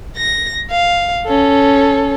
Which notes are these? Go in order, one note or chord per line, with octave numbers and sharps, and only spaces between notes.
A#6
F5
C#4 A4